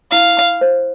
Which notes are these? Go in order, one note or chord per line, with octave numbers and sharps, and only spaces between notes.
E4 F5
B5
C5